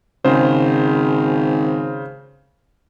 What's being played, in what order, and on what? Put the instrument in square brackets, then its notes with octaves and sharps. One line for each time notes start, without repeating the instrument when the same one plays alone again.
[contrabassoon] G#1 [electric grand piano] C#3 C5